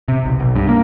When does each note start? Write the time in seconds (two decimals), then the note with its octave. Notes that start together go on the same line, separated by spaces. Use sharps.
0.08 C3
0.25 B1
0.40 B1
0.56 G2
0.69 A#3